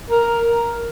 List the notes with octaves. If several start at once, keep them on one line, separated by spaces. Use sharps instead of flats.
A#4